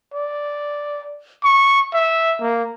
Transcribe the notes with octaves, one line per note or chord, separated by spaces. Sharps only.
D5
C#6
E5
A#3